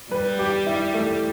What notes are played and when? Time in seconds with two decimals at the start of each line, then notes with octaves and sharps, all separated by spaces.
0.11 G3 B4
0.39 G4
0.66 E4
0.94 A3